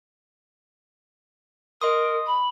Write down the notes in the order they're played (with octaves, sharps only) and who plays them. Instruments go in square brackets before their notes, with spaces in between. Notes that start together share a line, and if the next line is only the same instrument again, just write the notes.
[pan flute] A#4 [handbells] D#5 C6 D#6
[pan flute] B5